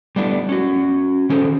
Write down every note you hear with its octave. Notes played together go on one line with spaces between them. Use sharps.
G3 A3 B3 D4 E4
C#4 F#4
D#3 C#4 G#4 A4 C5